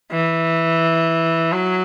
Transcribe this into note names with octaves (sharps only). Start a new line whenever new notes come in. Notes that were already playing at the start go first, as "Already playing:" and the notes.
E3
F#3